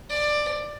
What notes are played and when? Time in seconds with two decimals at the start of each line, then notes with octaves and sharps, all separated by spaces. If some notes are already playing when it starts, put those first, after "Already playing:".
0.10 D5